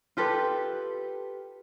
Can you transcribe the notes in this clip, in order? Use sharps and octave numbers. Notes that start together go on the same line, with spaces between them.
F4 G4 A4 B4